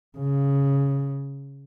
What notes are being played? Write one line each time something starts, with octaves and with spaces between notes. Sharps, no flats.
C#3